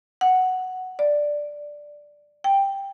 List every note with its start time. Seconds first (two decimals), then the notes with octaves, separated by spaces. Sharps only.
0.21 F#5
0.99 D5
2.44 G5